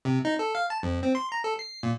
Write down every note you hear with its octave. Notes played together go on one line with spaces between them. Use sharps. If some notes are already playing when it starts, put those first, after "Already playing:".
C3
D#4
A4
F5
A5
F2
C4
C6
A#5
A4
C7
A#2